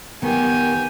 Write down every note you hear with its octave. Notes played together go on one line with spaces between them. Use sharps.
D#3 B3 G4 G#5